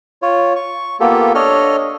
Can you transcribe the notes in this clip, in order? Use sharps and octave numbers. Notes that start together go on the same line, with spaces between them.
F4 C#5
C#6
A#3 B3 F4 G4 A4
D4 A4 C#5 D#5 F6